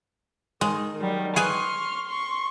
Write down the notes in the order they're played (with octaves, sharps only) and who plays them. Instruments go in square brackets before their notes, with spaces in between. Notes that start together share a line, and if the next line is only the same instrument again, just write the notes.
[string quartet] D#3 [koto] G#3
[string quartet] D#3 F#3 G3
[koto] G#4 B4 G#5 [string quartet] C6 C#6 F6
[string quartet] C6 C#6